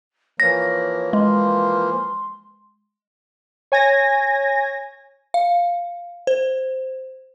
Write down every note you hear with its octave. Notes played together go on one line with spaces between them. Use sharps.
E3 F3 A#3 C#5 A#6
G#3 C6
C#5 G#5 G#6 A#6
F5
C5